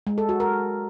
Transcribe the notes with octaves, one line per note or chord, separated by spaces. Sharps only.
G#3
A4
F#4
A#4